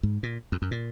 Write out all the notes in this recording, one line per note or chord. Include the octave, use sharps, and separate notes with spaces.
G#2
A#2
F2
F#2
A#2